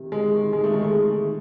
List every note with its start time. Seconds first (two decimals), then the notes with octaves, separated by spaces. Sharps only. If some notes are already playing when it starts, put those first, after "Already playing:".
Already playing: C3 D#3
0.12 D#3 G#3
0.32 D#3
0.52 D#3 G#3
0.64 A3
0.72 D#3 G#3
0.85 G#3
0.92 D#3 A3
1.13 D#3